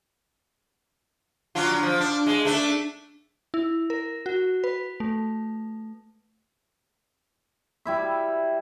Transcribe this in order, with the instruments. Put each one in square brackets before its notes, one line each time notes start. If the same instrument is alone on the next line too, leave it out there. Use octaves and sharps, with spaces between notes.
[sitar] F#3 D4 F4
F#3
F3
D4
G#3
A3 D4
[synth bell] E4
A#4
F#4
B4
A3
[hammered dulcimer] G3 E4 E5